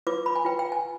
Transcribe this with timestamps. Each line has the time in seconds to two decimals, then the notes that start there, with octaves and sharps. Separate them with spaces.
0.07 F4 B4 D6
0.26 B5
0.35 G#5
0.45 F4 B4 G5
0.59 G5
0.72 G#5